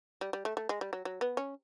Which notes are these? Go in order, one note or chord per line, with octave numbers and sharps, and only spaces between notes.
G3
G3
A3
A3
G#3
G3
F#3
F#3
B3
C#4